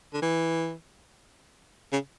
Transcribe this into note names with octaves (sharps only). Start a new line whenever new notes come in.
D3
E3
C#3